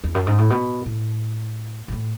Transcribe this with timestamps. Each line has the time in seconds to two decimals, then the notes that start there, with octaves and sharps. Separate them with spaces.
0.04 E2
0.15 F#2
0.27 G#2
0.38 A2
0.50 B2
0.86 A2
1.88 B2
1.92 A2